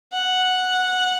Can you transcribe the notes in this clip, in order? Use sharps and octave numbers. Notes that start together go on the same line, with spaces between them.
F#5